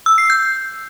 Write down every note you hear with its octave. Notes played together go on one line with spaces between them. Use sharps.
E6
C7
G6